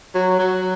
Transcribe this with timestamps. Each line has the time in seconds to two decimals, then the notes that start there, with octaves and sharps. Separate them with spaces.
0.15 F#3
0.39 F#3